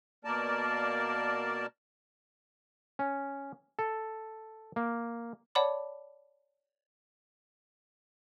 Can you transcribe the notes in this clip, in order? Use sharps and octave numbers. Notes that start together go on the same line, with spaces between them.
B2 A#3 A#4 D5 A5
C#4
A4
A#3
C#5 D5 F#5 A5 B5 D6